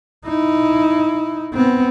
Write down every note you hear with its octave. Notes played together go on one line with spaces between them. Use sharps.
D#4 E4
B3 C4